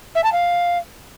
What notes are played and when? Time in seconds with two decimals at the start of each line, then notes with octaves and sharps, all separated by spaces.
0.15 E5
0.23 A5
0.32 F5